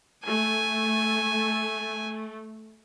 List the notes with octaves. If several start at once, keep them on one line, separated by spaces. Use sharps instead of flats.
A3 G#5